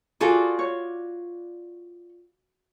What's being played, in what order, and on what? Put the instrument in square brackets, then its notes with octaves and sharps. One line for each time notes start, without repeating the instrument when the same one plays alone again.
[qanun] F4 F#4 D5 [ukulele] G#4 A4
[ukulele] C#5